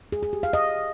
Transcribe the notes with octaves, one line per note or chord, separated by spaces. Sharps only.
G#4
G#4
G4
F5
D#5